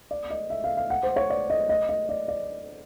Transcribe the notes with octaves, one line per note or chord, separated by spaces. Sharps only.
D5
D#5
E5
F5
F5
F#5
C5
C#5
D5
D#5
D#5
D#5
D5
D5